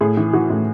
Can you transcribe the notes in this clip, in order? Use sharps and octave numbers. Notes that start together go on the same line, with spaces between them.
A2 G#4
E3
E3 F#4
A2